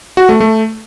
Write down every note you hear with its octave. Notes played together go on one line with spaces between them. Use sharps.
F#4
A3
A3